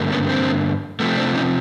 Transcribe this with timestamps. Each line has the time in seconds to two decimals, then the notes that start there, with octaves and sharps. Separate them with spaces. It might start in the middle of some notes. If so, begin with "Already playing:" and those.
Already playing: G2 D3 A#3
0.11 B3 C#4
0.29 C4
1.00 C3 F3 A3 B3
1.17 C4 D4
1.35 C#4 D#4